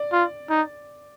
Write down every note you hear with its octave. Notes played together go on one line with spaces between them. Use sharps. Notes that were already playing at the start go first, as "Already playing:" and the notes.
Already playing: D5
F4
D#4